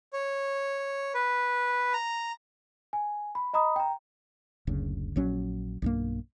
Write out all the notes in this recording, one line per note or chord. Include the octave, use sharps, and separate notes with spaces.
C#5
B4
A#5
G#5
B5
D#5 A#5 B5 D#6
G5 A#5
F#1 D2 C#3
A#1 F#3 C#4
B1 G2 A#3